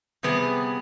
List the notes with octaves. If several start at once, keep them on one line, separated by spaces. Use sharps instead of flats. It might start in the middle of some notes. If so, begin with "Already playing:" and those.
C3 G3 B3 G#4